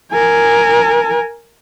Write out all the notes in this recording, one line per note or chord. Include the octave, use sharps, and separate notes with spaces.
A#4 G#5